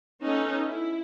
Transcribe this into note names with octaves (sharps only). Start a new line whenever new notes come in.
B3 C#4 D#4 A4
E4